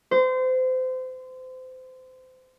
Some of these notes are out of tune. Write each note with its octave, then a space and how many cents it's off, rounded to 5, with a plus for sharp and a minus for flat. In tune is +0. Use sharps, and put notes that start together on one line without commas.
C5 -30